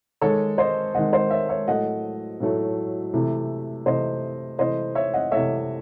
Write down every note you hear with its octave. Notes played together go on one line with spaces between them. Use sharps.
D#3 G#3 A4 C#5
C5 D#5
D#3 G#3 D#5 F#5
C5 D#5
C#5 E5
C#5 E5
A2 F#3 A3 D#5 F#5
A2 F#3 A3
C3 E3 A3
C3 E3 A3 C5 D#5
C3 E3 A3 C5 D#5
C#5 E5
D#5 F#5
C3 E3 A3 C#5 E5